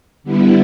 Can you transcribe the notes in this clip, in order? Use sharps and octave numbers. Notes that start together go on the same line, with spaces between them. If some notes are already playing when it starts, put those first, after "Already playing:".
D3 G3 B3 E4